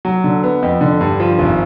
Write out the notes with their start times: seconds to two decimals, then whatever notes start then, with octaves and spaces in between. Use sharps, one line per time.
0.05 F#3
0.24 D3
0.43 B3
0.63 F2
0.81 D3
1.01 G2
1.20 F3
1.39 G#1